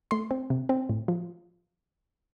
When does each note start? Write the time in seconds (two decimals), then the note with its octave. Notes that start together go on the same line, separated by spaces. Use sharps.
0.11 A3 C6
0.31 C4
0.50 C3
0.69 C4
0.89 A2
1.08 F3